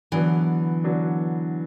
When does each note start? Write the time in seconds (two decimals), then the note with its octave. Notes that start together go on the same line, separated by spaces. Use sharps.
0.12 D3 E3 F#3 B3
0.84 D3 F#3 B3